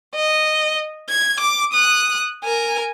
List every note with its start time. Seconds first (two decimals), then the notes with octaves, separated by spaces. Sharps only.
0.15 D#5
1.09 G#6
1.40 D6
1.73 D#6 F#6
2.44 A#4 G#5